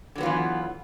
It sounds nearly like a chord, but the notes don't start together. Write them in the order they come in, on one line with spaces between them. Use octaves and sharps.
D3 F#3 B3 F4 E3